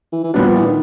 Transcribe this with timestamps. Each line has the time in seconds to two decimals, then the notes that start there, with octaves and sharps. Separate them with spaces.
0.13 E3
0.24 E3
0.34 A#2 F#3 G3 B3 D4
0.45 F3
0.55 E3
0.67 D#3